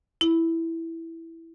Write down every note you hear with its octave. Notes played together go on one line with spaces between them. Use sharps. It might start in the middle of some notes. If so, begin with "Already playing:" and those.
E4